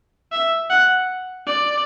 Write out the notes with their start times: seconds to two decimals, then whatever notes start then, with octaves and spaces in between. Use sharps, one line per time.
0.32 E5
0.70 F#5
1.47 D5